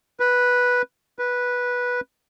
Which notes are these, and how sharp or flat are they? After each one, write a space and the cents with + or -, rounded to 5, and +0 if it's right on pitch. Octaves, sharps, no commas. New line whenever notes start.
B4 -5
B4 -10